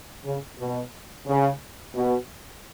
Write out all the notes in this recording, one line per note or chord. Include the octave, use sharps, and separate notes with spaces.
C#3
B2
C#3
B2